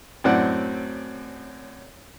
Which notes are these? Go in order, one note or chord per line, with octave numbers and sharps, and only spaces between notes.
F#2 A2 C4 D5 F#5